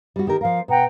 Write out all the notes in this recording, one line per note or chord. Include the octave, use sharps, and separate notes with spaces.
G3 F#4
D#3 G4 A#4
F3 A#4 F5
B2 F#5 G5 A#5